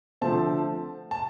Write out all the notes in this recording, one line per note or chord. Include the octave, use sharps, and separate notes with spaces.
D3 F3 A3 C4 A5
A5